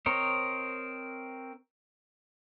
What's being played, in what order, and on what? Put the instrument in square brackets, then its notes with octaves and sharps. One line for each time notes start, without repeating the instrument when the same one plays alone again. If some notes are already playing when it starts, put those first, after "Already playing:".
[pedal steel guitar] C4 A#4 C5 C#5 D#5